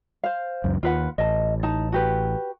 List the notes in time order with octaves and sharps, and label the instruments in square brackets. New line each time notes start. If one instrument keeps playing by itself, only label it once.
[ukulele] C5 F5
[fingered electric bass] C#2 F#2
[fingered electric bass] D#2 [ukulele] F4 B4 F#5
[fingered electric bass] A1 [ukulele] D#5 A5
[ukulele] D#4 A5
F#4 G4 B4